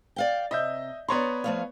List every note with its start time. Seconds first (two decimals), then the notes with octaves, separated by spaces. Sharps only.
0.16 D5 F5 G5
0.51 C3 D#5 E5 G6
1.08 B3 C#5 D5 A#5 C6
1.44 F3 A3 F5